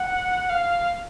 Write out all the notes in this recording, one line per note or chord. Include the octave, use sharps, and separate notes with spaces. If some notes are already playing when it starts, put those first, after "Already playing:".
Already playing: F#5
F5